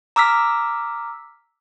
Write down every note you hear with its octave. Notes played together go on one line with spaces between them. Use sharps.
A#5 D6 E6 F6 B6